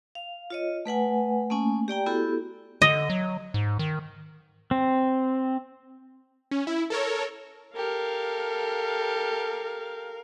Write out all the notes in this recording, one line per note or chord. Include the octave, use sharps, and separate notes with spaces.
F5
F4 C#5 D#5
A3 B4 F#5 G#5
A3 A#3 C#4 G#5
G4 D5 G5 A#5
B3 E4 F#4 G4 A4
D3 D#5
F#3
G#2
D#3
C4
C#4
E4
A4 A#4 C#5
G4 A4 A#4 F5